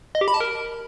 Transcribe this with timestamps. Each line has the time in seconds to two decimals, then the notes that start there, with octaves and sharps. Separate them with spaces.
0.15 D#5
0.21 G4
0.28 B5
0.34 A5
0.40 A#4